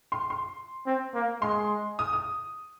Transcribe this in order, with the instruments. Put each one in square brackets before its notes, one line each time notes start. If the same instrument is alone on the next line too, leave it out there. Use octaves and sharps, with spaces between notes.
[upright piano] C6
C6
[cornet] C4
A#3
[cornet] G#3 [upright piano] C6
[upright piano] D#6
D#6